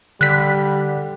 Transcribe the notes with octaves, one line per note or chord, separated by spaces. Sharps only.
D3 G3 F#6 B6